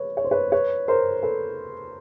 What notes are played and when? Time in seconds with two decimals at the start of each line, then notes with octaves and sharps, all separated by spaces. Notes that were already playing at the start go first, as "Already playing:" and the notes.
Already playing: B4 C#5
0.17 C#5
0.24 C5
0.31 B4 C#5
0.52 B4 C#5
0.88 A#4 C5
1.23 A4 B4